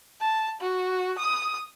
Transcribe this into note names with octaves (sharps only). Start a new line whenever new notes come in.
A5
F#4
D#6